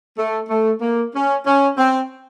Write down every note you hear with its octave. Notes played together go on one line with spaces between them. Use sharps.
A3
A3
A#3
C#4
C#4
C4